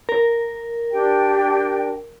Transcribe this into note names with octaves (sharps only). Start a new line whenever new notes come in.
A#4
D4 G4 G5